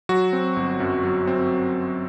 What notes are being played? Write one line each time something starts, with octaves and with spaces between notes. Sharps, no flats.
F#3 F#4
C4
G1
F#2
F#3
C4